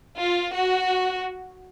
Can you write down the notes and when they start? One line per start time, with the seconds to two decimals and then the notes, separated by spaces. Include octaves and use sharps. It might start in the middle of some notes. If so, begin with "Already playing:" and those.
0.19 F4
0.54 F#4